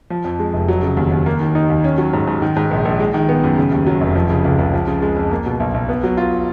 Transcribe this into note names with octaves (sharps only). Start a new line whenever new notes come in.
F3
F2
G#3
F1
F#3
C#3
D#2
D#2
A#3
D#3
D#4
D#2
C#4
F#3
G#2
G#2
D#3
G#2
A#1
A#1
G#3
D#3
B3
F#2
C#3
D#2
F#3
F1
F3
C#3
C#2
C#2
F3
C#3
G#3
F2
A#3
B2
B1
B1
B3
F#3
F4